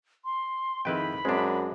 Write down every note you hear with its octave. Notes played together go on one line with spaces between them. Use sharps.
C6
F2 D#3 E4 G#4 B4 G5 B5
F#2 G#3 C4 D4